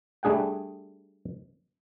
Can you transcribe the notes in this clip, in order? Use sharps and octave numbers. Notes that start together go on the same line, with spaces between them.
G3 A3 D4 G#4 F#5 G5